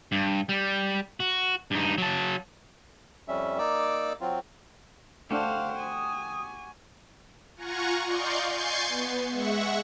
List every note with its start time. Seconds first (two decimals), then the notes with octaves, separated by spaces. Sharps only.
0.12 G2
0.49 G3
1.20 F#4
1.71 G2 D#4
1.98 F#3 A5
3.28 F2 G3 C#4 E5
3.58 A#3 D#4 D5 D6 E6
4.21 F#3 C4 F4
5.31 A3 D4 F#4 G4 C5 F5
5.79 G#5 D#6
7.56 F4 F#5 G#5 A#5 C#6
8.06 D5 D#5 F5 C6 C#6 G6
8.51 G#5 C6 C#6 G6 A6 C7
8.87 B3
9.30 G#3 E5 F#5 C#6